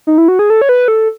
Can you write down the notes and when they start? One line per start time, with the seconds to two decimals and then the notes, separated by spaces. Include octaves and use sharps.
0.07 D#4
0.18 E4
0.28 F#4
0.39 G#4
0.50 A4
0.62 C#5
0.69 B4
0.88 A4